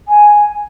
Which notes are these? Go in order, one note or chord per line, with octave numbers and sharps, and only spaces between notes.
G#5